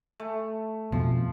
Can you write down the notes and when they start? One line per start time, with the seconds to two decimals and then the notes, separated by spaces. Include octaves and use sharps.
0.20 A3
0.92 F2 B2 F3